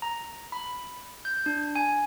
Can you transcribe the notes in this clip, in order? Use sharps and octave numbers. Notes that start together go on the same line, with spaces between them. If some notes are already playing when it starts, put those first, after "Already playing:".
A#5
B5
G6
D4
G#5